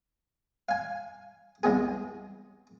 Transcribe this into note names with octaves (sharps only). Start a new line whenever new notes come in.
F5 G#5
C2 G#3 B3 G#4